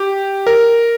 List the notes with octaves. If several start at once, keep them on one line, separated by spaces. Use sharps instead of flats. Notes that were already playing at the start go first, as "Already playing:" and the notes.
Already playing: G4
A#4